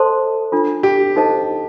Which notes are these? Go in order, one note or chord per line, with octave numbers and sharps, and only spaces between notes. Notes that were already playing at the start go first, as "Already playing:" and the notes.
Already playing: A4 C5 D#5 A5 C6
D4 F4 A4
G4
D#4 A4 C5 D#5 A5